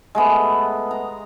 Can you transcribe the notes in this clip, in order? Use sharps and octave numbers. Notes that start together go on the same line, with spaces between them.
G#3 A3 B3
A#5